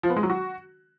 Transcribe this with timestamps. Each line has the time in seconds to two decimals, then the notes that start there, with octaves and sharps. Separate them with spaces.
0.03 F3
0.10 B3
0.16 G#3
0.23 F#3
0.30 F#4